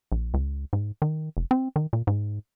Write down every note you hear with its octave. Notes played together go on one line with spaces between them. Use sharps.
A#1
C#2
G#2
D#3
F1
C4
D#3
A#2
G#2